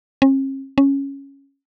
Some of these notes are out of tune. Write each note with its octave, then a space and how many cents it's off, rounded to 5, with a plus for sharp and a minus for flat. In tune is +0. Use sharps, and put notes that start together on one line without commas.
C#4 -45
C#4 -5